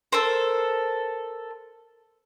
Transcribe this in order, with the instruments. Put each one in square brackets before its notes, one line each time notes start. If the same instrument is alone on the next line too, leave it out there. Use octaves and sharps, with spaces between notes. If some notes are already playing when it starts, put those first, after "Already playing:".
[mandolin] A4 A#4 C5